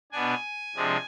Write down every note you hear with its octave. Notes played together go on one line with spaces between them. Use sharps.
B2 B3 D4 G#5
C3 F3 G#3 D4